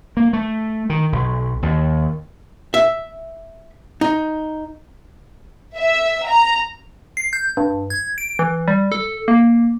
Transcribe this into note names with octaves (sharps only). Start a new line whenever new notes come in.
A#3
A3
D#3
B1
D#2
E5
D#4
E5
A#5
C7
G6
G2
G#6
D7
E3
G3
A4
A#3